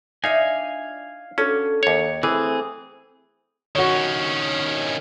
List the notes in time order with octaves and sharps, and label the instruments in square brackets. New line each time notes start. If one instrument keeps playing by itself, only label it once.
[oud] D4 F4 E5 [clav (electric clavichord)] D#4 [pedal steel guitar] F5 G#5
[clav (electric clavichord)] C#4 [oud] D4 F#4 A4
[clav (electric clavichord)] D#2 C#5
[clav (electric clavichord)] E3 [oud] A3 [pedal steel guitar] C4 G#4
[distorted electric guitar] D#3 C#4 [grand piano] F#4 C#5